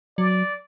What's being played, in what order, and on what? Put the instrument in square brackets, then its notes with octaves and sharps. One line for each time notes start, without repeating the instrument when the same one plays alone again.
[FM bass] F#3 [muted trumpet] D5